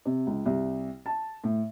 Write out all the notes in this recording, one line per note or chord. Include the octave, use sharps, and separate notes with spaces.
C3
C#2
C2
A5
A2